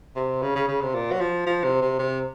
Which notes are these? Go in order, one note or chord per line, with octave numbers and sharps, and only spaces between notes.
C3
C#3
C#3
C#3
C3
A#2
F#3
F3
F3
C3
C3
C3